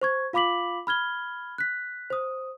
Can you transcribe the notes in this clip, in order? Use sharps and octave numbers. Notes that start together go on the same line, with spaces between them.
C5 C#6 G#6
F4 F5 B5 D6 B6 F#7
B5 F6 G#6 G7
F#6 B6
C5 D#6